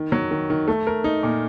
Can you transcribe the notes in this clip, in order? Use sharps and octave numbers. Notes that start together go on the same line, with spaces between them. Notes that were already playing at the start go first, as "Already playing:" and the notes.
Already playing: D#3
F#3
D#3
D#3
A3
A#4
D#4
A#2